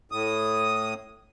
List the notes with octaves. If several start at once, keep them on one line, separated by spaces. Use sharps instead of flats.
A2 D#6